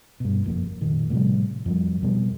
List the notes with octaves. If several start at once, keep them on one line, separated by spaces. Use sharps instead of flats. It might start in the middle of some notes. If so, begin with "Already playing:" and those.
G2 B2
F#1 F2 A#3
F1 A#2 D#3
A2 C3 F3 G3
F2 F3 G3
F2 B2 G3 B3